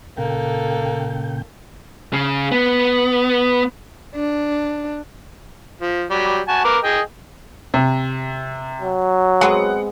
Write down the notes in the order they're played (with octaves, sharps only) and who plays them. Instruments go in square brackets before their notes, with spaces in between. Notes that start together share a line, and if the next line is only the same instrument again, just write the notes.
[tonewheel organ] A#2 C#3 G5 [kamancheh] A#3 A4
[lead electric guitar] C#3
B3
[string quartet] D4
[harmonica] F3
F#3 G3
F#4 G#5 A5
A#4 B4 D6
G#4 D#5 G5
[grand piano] C3
[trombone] F#3
[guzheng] G#3 B3 C4 [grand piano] F#5